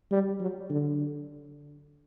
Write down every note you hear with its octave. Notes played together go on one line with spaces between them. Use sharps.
G3
F#3
D3